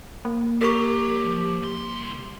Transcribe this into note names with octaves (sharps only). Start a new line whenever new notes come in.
A#3
G4 A#4 C#5 A#5 C#6
F3
C2 C6